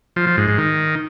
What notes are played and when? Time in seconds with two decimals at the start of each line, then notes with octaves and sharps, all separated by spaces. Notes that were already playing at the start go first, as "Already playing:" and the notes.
0.16 F3
0.27 F3
0.37 G#2
0.48 G#2
0.58 D#3